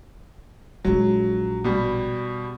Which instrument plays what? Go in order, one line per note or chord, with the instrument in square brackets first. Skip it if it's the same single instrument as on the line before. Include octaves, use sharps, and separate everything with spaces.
[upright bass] A#1 G#3 [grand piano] F#3
[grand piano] B2 G3